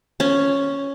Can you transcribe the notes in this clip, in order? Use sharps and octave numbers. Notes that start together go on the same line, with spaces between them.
C#4